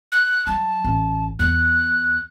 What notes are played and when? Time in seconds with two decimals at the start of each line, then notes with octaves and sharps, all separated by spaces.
0.12 F#6
0.47 F#3 A5
0.84 A1
1.39 E2 F#6